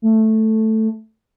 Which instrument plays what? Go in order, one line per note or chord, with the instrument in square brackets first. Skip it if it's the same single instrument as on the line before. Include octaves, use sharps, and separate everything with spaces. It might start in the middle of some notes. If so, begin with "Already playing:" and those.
[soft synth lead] A3